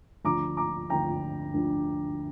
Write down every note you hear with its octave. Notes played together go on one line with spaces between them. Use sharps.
D2 D3 F3 A#5 D6
A#5 D6
D2 D3 F3 G5 A#5
D2 D3 F3